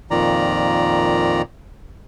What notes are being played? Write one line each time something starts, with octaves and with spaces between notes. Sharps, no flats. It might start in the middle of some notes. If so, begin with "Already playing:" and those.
F2 A#2 D#3 D5 A#5